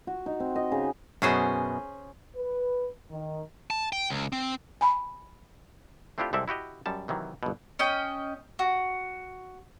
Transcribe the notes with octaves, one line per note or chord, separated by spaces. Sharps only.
F#4
D#4
C4
D#5
C#3
F#2 B2 C#4 G#4 C5
B4
D#3
A5
G5
C#2
C4
G#5 B5
A3 C4 D4 E4 F4 G4
C2 G#3 C4 A4 D5 E5
E4 F#4 G4 D#5
F#2 G3 A5
C3 D#3 E3 F#3
G1 B2
C#4 D#5 G5
F#4